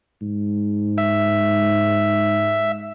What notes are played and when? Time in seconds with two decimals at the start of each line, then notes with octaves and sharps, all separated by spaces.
0.21 G#2
0.98 E5